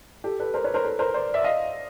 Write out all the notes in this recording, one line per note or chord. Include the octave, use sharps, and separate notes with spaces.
G4 A4
A4 B4
A#4 C5
B4 C#5
A#4 C5
A4 B4
A#4 C5
C5 D5
D5 E5
D#5 F5